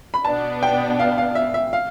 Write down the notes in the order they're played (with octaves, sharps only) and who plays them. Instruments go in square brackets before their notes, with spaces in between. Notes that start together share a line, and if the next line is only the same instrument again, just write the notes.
[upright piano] B5
[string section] B2 B3 D4 [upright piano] A5
[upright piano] G5
F5
F5
E5
E5
F5